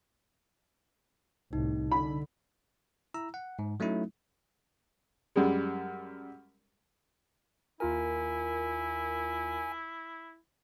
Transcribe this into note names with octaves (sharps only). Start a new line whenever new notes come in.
C2 A2 D#4
D3 B5
E4 A#5 E6
F#5
G#2
F#3 A3 C#4 D#4 E4
F#2 G3 G#3
D#2 E4 F4 A#4 G#5